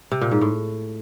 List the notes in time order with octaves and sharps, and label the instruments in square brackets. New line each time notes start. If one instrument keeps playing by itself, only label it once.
[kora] C3
A#2
G#2
A2